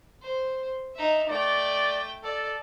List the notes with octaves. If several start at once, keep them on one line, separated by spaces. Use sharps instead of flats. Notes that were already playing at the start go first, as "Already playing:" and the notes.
C5
D#4 E5
A3 D5 G5
A4 D5